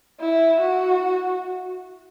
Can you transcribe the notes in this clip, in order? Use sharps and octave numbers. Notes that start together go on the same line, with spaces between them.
E4
F#4